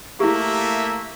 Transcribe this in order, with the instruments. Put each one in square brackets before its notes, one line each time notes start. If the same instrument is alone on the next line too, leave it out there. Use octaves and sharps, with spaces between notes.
[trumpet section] A3 A#3 E5 [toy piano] E4 G4